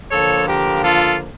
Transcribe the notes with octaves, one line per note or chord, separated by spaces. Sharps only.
D3 F3 A#3 A4 C#5
G4 A#4
F4 A4